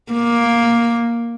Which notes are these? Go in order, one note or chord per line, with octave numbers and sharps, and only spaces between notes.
A#3